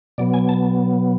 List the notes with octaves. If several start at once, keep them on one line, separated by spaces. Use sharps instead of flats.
B2 F#3 B3 D5
G#5
A5